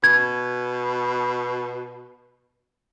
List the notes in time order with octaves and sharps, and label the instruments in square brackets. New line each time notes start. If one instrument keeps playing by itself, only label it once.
[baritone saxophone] B2 [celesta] G#6